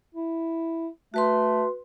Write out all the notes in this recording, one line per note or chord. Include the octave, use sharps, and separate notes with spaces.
E4
A3 F#4 B4 C6